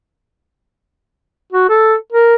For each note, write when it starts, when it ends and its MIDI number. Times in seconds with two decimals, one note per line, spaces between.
1.52 1.66 66
1.69 1.95 69
2.12 2.36 70